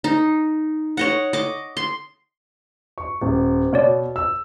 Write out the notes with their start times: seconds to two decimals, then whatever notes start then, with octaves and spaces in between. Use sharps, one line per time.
0.04 D#4
0.97 C#5 D#5 F#5
1.33 D#5 D6
1.77 C6
2.98 C#6
3.21 D#1
3.73 B2 B3 C#5 D5
4.16 E6